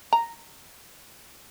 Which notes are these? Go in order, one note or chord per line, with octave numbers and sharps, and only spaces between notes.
A#5